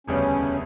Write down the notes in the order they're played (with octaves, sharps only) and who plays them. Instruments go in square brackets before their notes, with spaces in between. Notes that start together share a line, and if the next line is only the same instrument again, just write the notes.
[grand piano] E1 D2 C#3 G3 B3 [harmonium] C#4